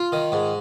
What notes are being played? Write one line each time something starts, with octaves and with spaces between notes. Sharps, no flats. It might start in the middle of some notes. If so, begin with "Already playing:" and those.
Already playing: F4
D#3
G#2